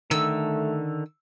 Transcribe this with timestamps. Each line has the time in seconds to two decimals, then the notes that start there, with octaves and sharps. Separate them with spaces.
0.11 D3 D#3 A3 E6